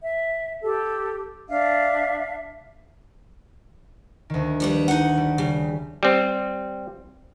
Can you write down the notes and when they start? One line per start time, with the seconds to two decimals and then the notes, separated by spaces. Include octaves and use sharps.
0.02 E5
0.62 G4 A4
1.48 D4 E5 F5
4.30 D2 D#3
4.60 F3 G3 B4
4.88 D#4 F#5
5.17 G3
5.38 C#3 G3
6.03 G3 C4